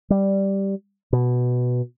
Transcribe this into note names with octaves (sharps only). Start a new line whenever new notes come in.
G3
B2